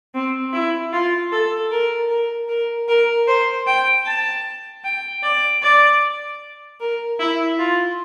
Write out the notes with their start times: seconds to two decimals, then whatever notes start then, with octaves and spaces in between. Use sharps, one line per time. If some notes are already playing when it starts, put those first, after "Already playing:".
0.14 C4
0.53 E4
0.93 F4
1.32 A4
1.71 A#4
2.10 A#4
2.49 A#4
2.88 A#4
3.28 C5
3.67 G5
4.06 A5
4.84 G5
5.23 D5
5.62 D5
6.80 A#4
7.19 E4
7.59 F4